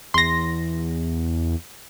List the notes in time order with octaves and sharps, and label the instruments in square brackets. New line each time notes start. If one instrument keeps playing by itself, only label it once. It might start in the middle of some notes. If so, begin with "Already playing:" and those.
[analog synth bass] E2 [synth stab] C6 A#6